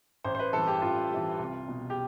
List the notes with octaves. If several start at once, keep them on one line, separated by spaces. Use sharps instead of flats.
A1 C5
C5
B4
G2 E3 A4
G4
A1 F4
G2 E3
C2
B2
G4